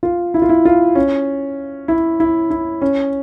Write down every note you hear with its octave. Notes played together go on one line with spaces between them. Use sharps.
F4
E4
F4
E4
F4
C#4
E4
E4
E4
C#4